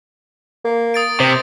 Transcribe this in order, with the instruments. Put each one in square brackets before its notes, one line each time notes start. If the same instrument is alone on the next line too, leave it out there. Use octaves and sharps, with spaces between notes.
[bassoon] A#3
[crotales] D#6 A6 D7
[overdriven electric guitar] C3 [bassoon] C5